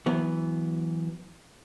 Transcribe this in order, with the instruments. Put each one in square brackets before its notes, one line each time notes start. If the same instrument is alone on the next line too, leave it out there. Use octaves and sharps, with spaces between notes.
[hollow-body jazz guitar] E3 F#3 B3